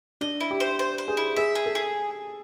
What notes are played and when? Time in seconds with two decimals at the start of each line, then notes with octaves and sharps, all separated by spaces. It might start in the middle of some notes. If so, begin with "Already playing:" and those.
0.21 D4 D#5
0.41 E4
0.51 G4
0.60 C5
0.79 C5
0.98 C5
1.08 G#4
1.17 E4
1.36 G#4 E5
1.55 G#4
1.66 A4
1.75 G#4